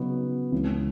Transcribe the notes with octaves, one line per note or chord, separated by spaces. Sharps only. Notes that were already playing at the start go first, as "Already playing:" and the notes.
Already playing: C#3 F#3 B3 D#4 F#4
C#2 C#3 E3